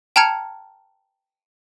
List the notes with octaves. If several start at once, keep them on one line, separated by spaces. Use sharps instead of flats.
G5 A5 A#5 F6 G#6 C#7